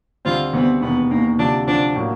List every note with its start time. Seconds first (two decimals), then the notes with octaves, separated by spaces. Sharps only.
0.25 D2 D3 G3 C4 F4
0.53 D2 D3 G3 B3 C4
0.81 E1 D#2 D#3 B3
1.10 E1 D#2 D#3 A#3
1.39 D2 C3 F3 D4
1.67 D2 C3 F3 D4
1.96 A2 F#3 A#3